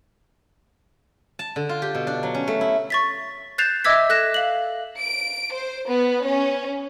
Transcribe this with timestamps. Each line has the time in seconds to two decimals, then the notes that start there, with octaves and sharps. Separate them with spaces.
1.39 A5
1.56 D3
1.69 F4
1.82 G4
1.95 B2
2.07 D4
2.23 F#3
2.34 C#4
2.48 A3
2.61 E4
2.90 C#6 A6 B6
3.58 F#6 G6 A6 C7 E7 F7
3.84 D#5 E5 D6 E6 G#6 B6
4.09 A4 F#6 A#6 E7
4.34 F5 F#7
4.99 D7
5.52 C5
5.88 B3
6.25 C#4